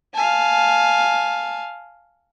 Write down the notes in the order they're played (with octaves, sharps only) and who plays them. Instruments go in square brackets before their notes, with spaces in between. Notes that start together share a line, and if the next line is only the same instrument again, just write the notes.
[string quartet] F5 G#5 A5